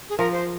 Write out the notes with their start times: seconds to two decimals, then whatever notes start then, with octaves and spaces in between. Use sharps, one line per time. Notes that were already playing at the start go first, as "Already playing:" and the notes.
0.09 G#4
0.18 F3 A#4
0.32 C5